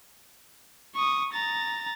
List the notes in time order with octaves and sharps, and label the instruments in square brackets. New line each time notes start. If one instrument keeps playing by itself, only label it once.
[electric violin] C#6 D#6
A#5 A6